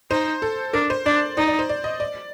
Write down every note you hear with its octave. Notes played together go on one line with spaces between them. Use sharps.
D#4 C5
A4
D4 A#4
C5
D4 D5
D#4 D5
D5
C5
D5
D#5
D5